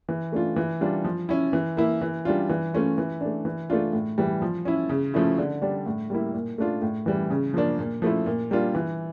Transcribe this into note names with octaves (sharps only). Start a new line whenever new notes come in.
E3
A3 D4 F4
E3
G3 D4 F4
F3
C#4 E4
E3
A#3 E4
E3
G3 D4 F4
E3
A3 C#4 F4
E3
A3 D4
E3
A3 D4 F4
A2
E3 G3
F3
C#4 E4
C#3
F3 A3 C#4 E4
D3
G3 D4
A2
G3 A#3 E4
A#2
A3 D4 F4
A2
E3 G3
C#3
F3 A#3 D4
A#2
F3 A3 E4
A#2
G3 A#3 D4 F4
E3